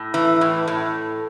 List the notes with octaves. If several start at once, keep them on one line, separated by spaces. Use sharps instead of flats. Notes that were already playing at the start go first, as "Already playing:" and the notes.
Already playing: A2
E3
A2
A2